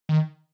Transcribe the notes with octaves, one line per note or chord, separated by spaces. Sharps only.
D#3